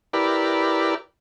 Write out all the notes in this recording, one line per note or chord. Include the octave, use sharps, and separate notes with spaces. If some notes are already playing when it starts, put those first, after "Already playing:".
E4 G4 A#4 B4 D5